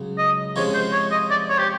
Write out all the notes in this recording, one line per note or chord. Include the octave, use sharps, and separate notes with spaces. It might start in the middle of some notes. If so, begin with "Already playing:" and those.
Already playing: C#2 C#3 F#3
D#5
C3 F3 G#3 C#4 C#5
C5
C#5
D#5
D5
C#5
G4